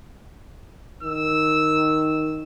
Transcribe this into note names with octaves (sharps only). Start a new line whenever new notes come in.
D#3 E6